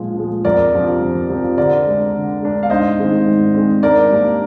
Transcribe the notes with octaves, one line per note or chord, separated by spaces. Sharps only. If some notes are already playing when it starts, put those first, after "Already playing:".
Already playing: A#2 F3 G#3
F3 G#3
F2 A#4 D5
C3 F3 C4
F2
C3 F3 C4
D3 A#4 D5
G#3 D4
D3
G#3 D4
F5
G#2 C5 D#5
D#3 G#3 C4
G#2
D#3 G#3 C4
G#2 A#4 D5
G3 A#3 D4